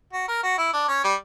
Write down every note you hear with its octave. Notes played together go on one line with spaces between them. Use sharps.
F#4
A#4
F#4
E4
D4
C#4
G3